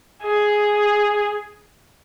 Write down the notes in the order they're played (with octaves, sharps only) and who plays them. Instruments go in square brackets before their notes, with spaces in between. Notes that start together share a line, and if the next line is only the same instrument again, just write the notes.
[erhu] G#4